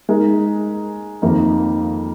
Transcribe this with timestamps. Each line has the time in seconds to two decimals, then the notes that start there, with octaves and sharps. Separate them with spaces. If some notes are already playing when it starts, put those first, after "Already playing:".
0.09 G#3 D#4 A#4
1.22 F2 D#3 A#3 D#4